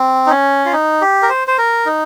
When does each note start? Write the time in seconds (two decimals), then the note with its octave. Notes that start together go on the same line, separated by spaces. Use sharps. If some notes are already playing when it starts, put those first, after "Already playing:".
Already playing: C4
0.26 D#4
0.30 C#4
0.65 F4
0.73 D#4
1.01 G4
1.22 A#4
1.29 C5
1.48 C5
1.58 A#4
1.86 D#4